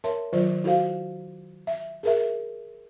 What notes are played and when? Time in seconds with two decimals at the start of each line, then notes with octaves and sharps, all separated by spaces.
0.04 A#4 C#5 E5 A5 C6
0.33 D#3 F#3 F4 C5 D5
0.64 E4 F#4 A4 C5 F5
1.67 E5
2.03 G#4 A#4 E5